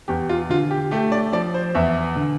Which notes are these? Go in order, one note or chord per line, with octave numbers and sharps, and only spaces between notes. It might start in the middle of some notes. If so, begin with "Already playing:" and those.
E2 G4
F4
D3 F4
G4
A3 G4
D5
F3 D5
C5
E2 E5
D3